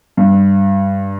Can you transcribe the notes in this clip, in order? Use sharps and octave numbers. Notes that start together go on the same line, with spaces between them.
G2